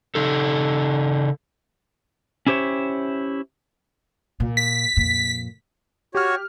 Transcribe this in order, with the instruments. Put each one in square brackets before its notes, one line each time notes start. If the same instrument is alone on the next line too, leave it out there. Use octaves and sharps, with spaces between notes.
[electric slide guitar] C#3 D#4 A4
[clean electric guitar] C#4 E4 G4 C5 C#5 E5
[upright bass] A#2
[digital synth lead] B6
[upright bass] F2 A#2
[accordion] F#4 C#5 [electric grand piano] G4 F6